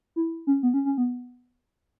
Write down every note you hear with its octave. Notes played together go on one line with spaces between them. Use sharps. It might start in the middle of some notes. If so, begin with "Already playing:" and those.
E4
C#4
B3
C#4
C#4
B3